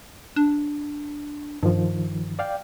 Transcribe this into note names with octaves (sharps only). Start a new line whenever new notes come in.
D4
G2 D#3 F3
D5 F5 G5